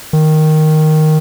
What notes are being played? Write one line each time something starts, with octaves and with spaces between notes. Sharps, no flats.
D#3